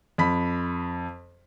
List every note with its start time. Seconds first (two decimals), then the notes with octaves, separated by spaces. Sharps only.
0.18 F2 B5 B6